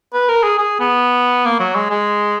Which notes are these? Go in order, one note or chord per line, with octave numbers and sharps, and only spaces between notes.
B4
A#4
G#4
G#4
B3
A#3
F#3
G#3
G#3